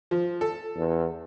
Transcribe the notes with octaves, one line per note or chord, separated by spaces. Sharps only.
F3
A4
E2